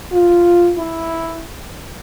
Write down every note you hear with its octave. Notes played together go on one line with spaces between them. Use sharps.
F4
E4